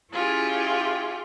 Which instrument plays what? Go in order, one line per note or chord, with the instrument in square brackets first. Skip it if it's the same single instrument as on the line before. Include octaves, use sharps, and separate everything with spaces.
[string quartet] C#4 E4 F4 G4 G#4